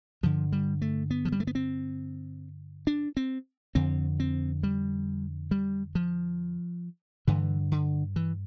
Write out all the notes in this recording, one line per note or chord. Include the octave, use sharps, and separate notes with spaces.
G2 D3 F3
G3
A3
B3
F3
G3
A3
B3
C4
D4
C4
F2 D3 C4
C4
G3
G3
F3
G2 D3 E3
D3
E3